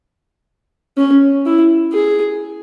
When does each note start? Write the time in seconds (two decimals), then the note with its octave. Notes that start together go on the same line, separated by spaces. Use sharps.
0.97 C#4
1.46 E4
1.93 G#4